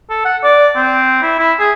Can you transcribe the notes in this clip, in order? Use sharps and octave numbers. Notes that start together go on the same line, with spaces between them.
A4
F#5
D5
C4
E4
E4
G#4